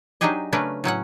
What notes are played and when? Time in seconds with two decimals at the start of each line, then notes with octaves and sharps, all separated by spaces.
0.21 F#3 D4 D#4 G4 G#4 D#5
0.52 C#3 A3 C#4 D4 A#4 B4
0.84 A2 F#3 C#4 F#5